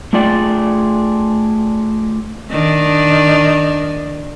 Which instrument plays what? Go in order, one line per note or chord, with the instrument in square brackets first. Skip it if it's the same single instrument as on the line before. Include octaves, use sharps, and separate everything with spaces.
[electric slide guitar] A3 D4 F4 G#4 D5 G5
[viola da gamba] D#3 D4